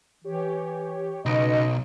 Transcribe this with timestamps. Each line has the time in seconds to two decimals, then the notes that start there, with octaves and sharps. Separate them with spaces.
0.24 E3 G4 C#5
1.26 B1 C#3 D#4 B4 D#5 C#7